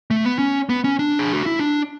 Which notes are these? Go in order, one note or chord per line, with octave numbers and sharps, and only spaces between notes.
A3
B3
C#4
B3
C#4
D4
G#4
F#4
E4
D4